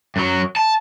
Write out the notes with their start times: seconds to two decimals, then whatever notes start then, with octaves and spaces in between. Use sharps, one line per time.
0.16 F#2 F#3
0.56 A5